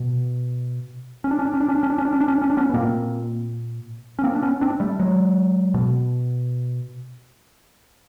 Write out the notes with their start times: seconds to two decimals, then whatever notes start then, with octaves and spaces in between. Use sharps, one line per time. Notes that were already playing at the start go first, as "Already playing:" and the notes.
Already playing: B2
1.24 C#4
1.31 D4
1.39 C#4
1.45 D4
1.54 C#4
1.60 D4
1.68 C#4
1.75 D4
1.83 C#4
1.90 D4
1.98 C#4
2.05 D4
2.13 C#4
2.20 D4
2.28 C#4
2.35 D4
2.42 C#4
2.50 D4
2.57 B3 C#4
2.69 B3
2.74 A#2 A#3 C4
4.19 C#4
4.23 A#3 C4
4.35 D4
4.42 B3 C#4
4.61 C4 D4
4.80 G3 A3
4.99 F#3 G#3
5.74 B2